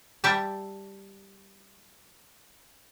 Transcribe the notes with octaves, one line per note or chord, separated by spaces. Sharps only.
G3 E5 G5 A5